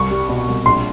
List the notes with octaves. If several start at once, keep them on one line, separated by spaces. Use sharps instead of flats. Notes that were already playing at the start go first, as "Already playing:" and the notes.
Already playing: C2 C#6
G3
B2
C2
A#1 C6